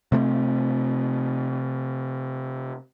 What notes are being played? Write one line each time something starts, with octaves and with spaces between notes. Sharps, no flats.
C3 A3 A#3 C4